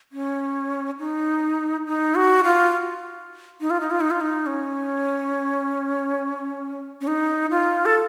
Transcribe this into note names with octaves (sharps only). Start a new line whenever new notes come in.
C#4
D#4
D#4
F#4
F4
D#4
F4
D#4
F4
D#4
F4
D#4
C#4
C#4
D#4
F4
A4